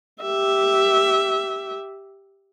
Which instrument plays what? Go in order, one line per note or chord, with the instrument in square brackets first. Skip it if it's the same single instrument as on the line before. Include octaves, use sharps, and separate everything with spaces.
[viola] G4 E5